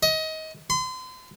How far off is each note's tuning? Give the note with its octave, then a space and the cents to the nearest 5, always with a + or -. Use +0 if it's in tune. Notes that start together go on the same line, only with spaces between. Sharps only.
D#5 +25
C6 -40